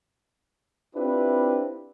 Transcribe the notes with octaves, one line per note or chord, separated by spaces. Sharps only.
C4 D4 E4 F4 G4 B4